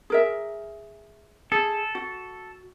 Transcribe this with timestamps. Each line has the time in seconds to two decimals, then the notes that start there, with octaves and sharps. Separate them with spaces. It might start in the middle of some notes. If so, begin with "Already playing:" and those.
0.10 G#4 A#4 E5
1.52 G#4 A4
1.95 F#4